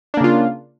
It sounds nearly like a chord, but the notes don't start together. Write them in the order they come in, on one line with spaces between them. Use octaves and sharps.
D4 A#3 C#3 F4